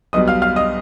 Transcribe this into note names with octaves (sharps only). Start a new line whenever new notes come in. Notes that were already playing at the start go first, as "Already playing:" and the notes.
B1 B2 G3 D#5 D#6
F5 F6
F5 F6
D#5 D#6